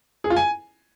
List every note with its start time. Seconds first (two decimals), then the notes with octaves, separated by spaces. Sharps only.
0.24 G#4
0.30 F4
0.36 G#5